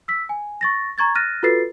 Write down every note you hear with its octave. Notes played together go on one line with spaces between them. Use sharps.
E6 B6
G#5
C#6 A6 A#6
A#5 C#6 G#6 A6
F6 F#6 A6 A#6 D#7
F4 F#4 A4 B4 A6 C7